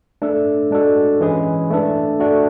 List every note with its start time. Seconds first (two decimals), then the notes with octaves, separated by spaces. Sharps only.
0.22 A3 D4 A4
0.71 G#3 D4 F#4 A4
1.21 E3 G#3 C#4 G#4 B4
1.70 A3 D4 A4
2.20 A3 D4 F#4